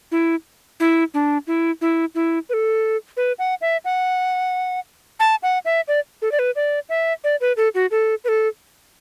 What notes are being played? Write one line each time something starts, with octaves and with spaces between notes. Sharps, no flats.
E4
E4
D4
E4
E4
E4
B4
A4
B4
F#5
E5
F#5
A5
F#5
E5
D5
A4
D5
B4
D5
E5
D5
B4
A4
F#4
A4
B4
A4